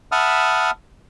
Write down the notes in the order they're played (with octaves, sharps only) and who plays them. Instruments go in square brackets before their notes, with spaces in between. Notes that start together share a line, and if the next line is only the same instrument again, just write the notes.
[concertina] E5 F#5 A5 B5 D#6 F6